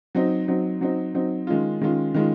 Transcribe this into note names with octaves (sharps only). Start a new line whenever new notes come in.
F#3 C4 D#4
F#3 C4 D#4
F#3 C4 D#4
F#3 C4 D#4
D#3 G#3 C#4 F4
D#3 G#3 C#4 F4
D#3 G#3 C#4 F4